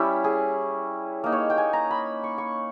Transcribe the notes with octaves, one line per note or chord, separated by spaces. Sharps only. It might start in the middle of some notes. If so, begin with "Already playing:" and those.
Already playing: G3 C#4 E4 G4
G#4
A#3 D#4
C#5
G5
G#5
A#5
B5
C#6
C#6